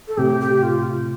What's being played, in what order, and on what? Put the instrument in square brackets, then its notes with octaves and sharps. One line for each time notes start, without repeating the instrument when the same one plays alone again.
[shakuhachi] A4
[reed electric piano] A2 C3 [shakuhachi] G4
[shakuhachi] G4
F4